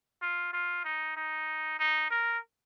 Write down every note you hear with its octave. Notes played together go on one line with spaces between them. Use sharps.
F4
F4
D#4
D#4
D#4
A#4